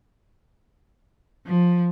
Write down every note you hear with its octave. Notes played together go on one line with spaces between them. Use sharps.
F3